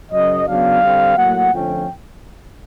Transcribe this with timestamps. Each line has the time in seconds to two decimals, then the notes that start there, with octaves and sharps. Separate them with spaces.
0.12 F#2 C#3 F#3 D#5
0.47 C#3 F#3 B3 D4 F5
0.81 D3 G3 C4
1.16 A2 F#3 A#3 F#5
1.52 F2 D3 F3 A3 C#4 G5